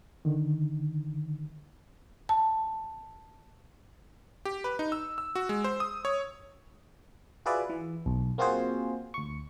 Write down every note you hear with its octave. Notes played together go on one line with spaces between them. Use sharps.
D3 D#3
A5
G4
B4
D#4
E6
E6
F#4
G#3
C5
D#6
C#5
F4 F#4 G#4 B4 D5 E5
E3
B1
A#3 C4 F4 F#4 G#4 C5
D2 C#6